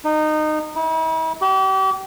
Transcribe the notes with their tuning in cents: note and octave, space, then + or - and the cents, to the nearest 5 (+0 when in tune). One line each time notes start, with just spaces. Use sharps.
D#4 -20
E4 -45
G4 -40